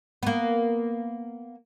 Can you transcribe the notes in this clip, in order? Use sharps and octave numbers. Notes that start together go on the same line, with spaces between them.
A#3 B3